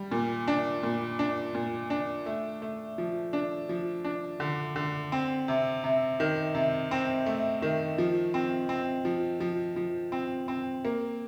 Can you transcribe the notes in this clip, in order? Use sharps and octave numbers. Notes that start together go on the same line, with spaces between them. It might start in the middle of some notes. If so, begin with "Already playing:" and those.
Already playing: G3
A#2
D4
A#2
D4
A#2
D4
A3
A3
F3
D4
F3
D4
D3
D3
C4
C3
C3
D#3
C3
C4
A3
D#3
F3
C4
C4
F3
F3
F3
C4
C4
A#3